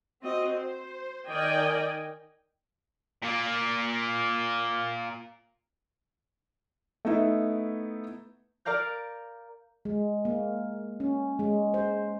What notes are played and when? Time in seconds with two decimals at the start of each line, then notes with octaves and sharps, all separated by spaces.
0.23 C4 F#4 D#5
0.56 C5
1.28 D#3 A#4 D5 D#5 G5 G#5
3.22 A#2 A#3
7.05 A3 B3 D#4 E4
8.65 A#4 D5 F5 A#5 G6
9.85 G#3
10.25 A#3
11.00 C#4
11.39 G#3
11.74 C5